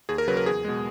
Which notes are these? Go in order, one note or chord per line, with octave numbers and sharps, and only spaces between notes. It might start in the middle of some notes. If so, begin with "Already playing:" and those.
D#2 G#4
A#4
C#3 F#3 B4
A#4
E2 G#4
B2 G#3